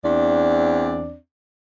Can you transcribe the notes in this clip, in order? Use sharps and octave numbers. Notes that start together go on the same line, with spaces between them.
E2 C4 D4 D5